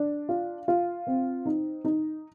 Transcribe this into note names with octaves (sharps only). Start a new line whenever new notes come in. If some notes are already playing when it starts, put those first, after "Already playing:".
Already playing: D4
F4
F4
C4
D#4
D#4